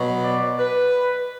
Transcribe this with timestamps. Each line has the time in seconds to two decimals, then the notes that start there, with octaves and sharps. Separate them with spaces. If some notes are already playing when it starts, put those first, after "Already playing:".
Already playing: B2 F#3
0.21 D5
0.59 B4